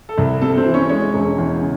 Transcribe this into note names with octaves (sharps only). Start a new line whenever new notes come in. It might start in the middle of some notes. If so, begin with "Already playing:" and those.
A4
C2
C3 A4
A4
C4 C5
E3
C#4 C#5
G#3 C#4 C#5
E1
E2
C#3